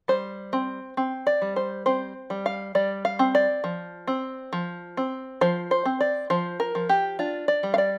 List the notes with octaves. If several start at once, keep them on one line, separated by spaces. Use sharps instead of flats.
G3 C5
C4
C4
D5
G3
C5
C4 C5
G3
F5
G3 D5
F5
C4
D5
F3
C4
F3
C4
F3 C5
C5
C4
D5
F3 C5
A#4
F3
G4
D4 F4
D5
G3
F5
D5